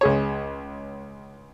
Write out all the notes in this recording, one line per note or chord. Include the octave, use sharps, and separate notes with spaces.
C#2 G#4 C#5